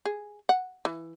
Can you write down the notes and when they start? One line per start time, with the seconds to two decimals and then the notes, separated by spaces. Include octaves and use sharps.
0.05 G#4
0.49 F#5
0.85 E3